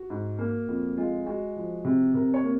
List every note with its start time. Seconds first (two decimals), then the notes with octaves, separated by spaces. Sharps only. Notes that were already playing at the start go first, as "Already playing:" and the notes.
Already playing: F#4
0.10 G#2
0.39 A#3
0.68 F2
0.97 G#3 F4
1.26 G#3 F#4
1.57 F3
1.85 C3
2.14 C3 A#4
2.34 C#5
2.44 A#3